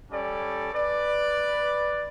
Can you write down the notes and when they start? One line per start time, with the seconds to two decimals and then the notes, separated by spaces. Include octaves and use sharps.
0.12 G3 C#4 A4 D5
0.74 B4 D5